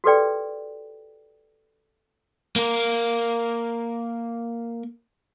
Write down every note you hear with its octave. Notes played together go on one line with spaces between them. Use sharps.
F#4 G4 A4 B4 D5 G5
A#3 A#4